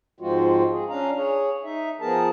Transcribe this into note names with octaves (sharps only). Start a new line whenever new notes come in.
G#2 F3 G#3 C4 F4 F#4
G#4
C#4 D4 F5 A#5
G#4 C#5
D#4 E5
F3 B3 G#4 A#4 A5